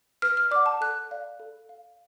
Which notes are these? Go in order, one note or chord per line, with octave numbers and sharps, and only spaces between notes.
B4 F6
F6
D5 F#5 D6
A5
A4 F#6
D5 F5
A4
F5